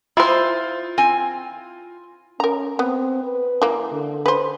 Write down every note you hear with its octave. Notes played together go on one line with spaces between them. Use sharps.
E4 F4 C5
C4 G#5
C#4 A#4 A#5
B3 C4
B4
E3 A#3
D3
B4 C5